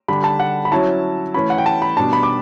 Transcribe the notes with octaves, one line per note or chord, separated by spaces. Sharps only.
D3 G3 D4 B5
A5
F#5
B5
F#3 C#4 E4 A5
E3 A3 C#4 B5
F#5
G5
A5
B5
B2 G3 D4 A5
B5
D6